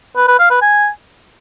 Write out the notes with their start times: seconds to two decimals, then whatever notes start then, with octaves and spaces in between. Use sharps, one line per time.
0.16 B4
0.28 B4
0.39 F5
0.50 B4
0.62 G#5